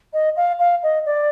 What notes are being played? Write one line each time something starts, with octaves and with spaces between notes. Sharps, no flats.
D#5
F5
F5
D#5
D5